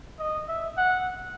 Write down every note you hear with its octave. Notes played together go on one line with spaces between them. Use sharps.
D#5
E5
F#5